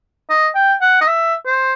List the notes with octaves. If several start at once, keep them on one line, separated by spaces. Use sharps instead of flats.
D#5
G5
F#5
D#5
E5
C5